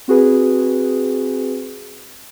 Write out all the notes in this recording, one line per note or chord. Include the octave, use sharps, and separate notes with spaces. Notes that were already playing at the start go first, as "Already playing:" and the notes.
C4 F#4 G#4 B4